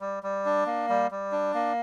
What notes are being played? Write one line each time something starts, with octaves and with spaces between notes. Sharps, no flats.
G3
G3
D4
A#3
G3
G3
D4
A#3